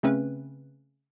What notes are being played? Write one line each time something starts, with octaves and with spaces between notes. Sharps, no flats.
C#3 A3 C4 C#4 B4